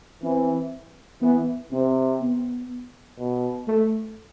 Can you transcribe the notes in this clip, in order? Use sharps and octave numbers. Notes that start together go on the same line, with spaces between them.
E3 C4
E3 B3
C3 C4
B3
B2
A3